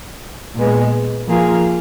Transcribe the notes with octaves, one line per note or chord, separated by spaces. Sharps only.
A#2 G#3 B3
F3 A#3 F4 G#4